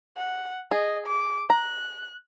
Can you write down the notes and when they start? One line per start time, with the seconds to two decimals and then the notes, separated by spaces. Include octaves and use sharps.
0.17 F#5
0.71 G#4 D#5
1.07 D6
1.50 A#5 F#6